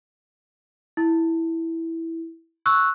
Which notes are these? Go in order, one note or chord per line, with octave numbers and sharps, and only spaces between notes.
E4
C#6 E6 F#6